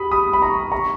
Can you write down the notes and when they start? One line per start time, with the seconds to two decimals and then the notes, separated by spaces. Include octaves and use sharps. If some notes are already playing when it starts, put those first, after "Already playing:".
Already playing: B5 D#6
0.11 B5 D#6
0.33 B5
0.42 A#5 C#6
0.72 A#5 C#6